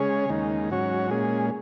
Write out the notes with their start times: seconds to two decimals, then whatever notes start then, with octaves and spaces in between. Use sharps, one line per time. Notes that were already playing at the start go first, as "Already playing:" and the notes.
Already playing: C#3 G#3 C#4 G#4 C#5
0.29 D#2 C#3 G#3 D#4
0.70 G#2 F#3 C#4 F#4 C#5
1.11 A#2 G#3 C#4 G#4